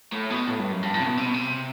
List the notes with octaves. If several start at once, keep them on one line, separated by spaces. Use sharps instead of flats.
A2
B2
A2
G2
F#2
G2
A2
C3
B2
C3
B2
C3